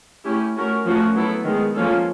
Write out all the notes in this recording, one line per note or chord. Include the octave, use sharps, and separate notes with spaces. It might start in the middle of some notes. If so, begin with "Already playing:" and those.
A3 C#4 E4 G4
A3 C#4 F#4 A#4
F3 A3 C#4 F#4 A#4
F#3 B3 E4 A4
D#3 G#3 B3
F3 A#3 C#4 F4 A4